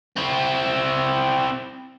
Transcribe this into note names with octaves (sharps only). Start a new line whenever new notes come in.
C4 E4